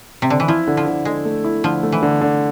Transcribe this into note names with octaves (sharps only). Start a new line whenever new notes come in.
C3
D3
E3
F3 E4
D3
F3
D3
D3 G#3
A3
E4
D3 F3
A3
E3
D3
D3